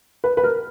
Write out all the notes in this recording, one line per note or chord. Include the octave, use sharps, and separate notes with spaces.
B4
B4
A#4